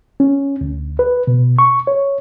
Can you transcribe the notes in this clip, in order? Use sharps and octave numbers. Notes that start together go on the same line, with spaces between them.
C#4
D2
B4
B2
C#6
C#5